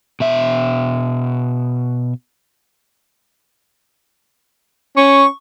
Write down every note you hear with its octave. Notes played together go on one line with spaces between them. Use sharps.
B2 E5
C#4 C#6